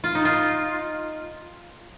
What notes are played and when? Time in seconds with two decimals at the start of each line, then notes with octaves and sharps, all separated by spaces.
0.04 F4
0.15 D#4
0.25 F4